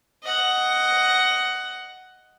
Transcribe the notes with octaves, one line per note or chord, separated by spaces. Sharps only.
D#5 F#5